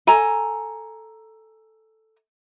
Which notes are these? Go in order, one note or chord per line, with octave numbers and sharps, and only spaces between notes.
A4 G#5 A#5